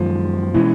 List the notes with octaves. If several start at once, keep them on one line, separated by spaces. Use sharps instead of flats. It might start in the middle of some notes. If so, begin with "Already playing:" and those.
Already playing: F#2 D#3 F3 G#3 B3
B2 E3 G#3 C#4